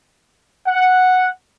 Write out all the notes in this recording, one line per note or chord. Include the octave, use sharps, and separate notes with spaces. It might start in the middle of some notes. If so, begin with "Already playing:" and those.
F#5